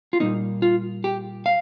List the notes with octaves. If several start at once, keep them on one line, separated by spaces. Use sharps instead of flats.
F4
A#2 G3 A#3 D#4
F4
G4
F5